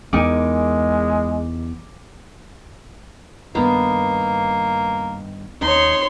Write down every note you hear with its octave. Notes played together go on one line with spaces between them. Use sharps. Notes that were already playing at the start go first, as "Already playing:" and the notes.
E2 G#3 D#4 A#4 G#5 D6
G2 D#3 A#3 B3
D#2 D#4 C#5 C6